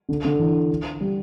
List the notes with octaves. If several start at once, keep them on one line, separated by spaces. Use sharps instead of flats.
D3
D3
E3
G3